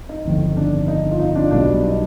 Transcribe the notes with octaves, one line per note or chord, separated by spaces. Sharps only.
D#4
G1 F2 D#3
D4
D#4
F4
D#4
D4 F4
B1 B2 G3 D4
D#4